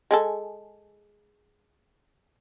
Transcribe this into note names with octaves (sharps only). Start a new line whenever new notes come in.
G#3 G#4 A4